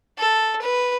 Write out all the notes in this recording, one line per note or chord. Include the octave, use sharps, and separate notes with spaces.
A4
B4